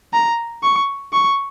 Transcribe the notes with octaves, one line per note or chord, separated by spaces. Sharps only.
A#5
C#6
C#6